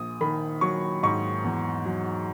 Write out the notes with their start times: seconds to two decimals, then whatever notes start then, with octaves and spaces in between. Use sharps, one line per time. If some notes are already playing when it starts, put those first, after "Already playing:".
Already playing: A#1 D#6
0.21 D#3 B5
0.61 F#3 C#6
1.03 G#2 C#6
1.44 E2
1.85 F#3